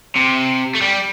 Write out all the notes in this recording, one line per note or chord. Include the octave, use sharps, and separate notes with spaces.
C3
A3
G3